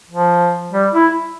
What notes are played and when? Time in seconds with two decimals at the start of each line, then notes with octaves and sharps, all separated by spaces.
0.10 F3
0.72 G3
0.93 E4